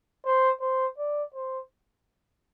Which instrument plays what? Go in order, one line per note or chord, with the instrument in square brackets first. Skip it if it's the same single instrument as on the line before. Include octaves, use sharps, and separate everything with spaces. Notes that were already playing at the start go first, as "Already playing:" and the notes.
[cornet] C5
C5
D5
C5